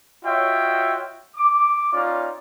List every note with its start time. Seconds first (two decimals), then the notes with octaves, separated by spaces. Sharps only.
0.25 F4 F#4 C#5 D#5 E5 G5
1.37 D6
1.94 C#4 D#4 F4 C#5 D5